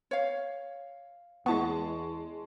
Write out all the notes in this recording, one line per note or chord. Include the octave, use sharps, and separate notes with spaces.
C#5 F5
E2 G#3 B3 E4 A5 C#6